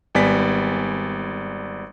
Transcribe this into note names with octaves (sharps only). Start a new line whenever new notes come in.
G#1 G3 B3 D5 G#5 B6